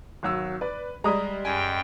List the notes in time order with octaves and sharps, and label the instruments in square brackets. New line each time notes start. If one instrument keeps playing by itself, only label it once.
[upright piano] G#1 F#3 E6
[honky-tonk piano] B4 [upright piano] D5
[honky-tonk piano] G3 G#3 [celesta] G4 D5 [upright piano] A#5 D#6
[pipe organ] F#2 G5 [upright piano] G#5